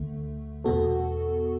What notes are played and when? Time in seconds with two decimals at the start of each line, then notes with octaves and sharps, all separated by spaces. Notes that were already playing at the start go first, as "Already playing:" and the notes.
Already playing: D2 D3 A3
0.64 E2 B2 B3 F#4 A4